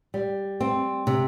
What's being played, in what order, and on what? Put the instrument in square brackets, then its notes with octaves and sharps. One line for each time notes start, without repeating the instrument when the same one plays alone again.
[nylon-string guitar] G3
C4
C3